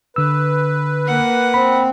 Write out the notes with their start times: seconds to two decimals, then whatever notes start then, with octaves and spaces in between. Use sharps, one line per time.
0.16 D3 B4 E6
1.06 A#3 F#5
1.54 C4 B5